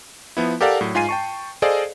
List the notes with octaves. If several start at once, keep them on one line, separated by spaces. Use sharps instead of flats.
F3 B3 E4
G4 A4 A#4 D5 F5 F#5
A2 F#3
G#2 F4 G#5 C7 D#7
G5 A5 C#6
G#4 A4 C5 D5 D#5 F5